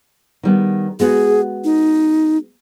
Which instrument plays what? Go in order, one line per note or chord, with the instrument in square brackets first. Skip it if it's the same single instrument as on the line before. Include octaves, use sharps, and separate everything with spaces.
[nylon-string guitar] D#3 G3 B3
[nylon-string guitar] G#3 B3 F#4 [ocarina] G#4
[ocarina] D#4